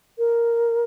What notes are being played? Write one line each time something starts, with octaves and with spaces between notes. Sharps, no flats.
A#4